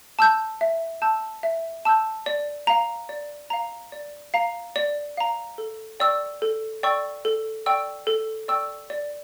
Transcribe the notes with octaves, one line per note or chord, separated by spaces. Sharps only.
A5 E6 G6
E5
A5 E6 G6
E5
A5 E6 G6
D5
F5 A#5
D5
F5 A#5
D5
F5 A#5
D5
F5 A#5
A4
D5 G5 C#6 E6
A4
D5 G5 C#6 E6
A4
D5 G5 C#6 E6
A4
D5 G5 C#6 E6
D5